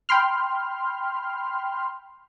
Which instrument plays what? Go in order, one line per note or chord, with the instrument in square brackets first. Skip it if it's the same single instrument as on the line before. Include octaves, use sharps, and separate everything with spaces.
[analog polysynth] G5 B5 C6 F6